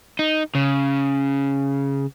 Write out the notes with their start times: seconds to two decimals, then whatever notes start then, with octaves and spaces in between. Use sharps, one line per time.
0.19 D#4
0.55 C#3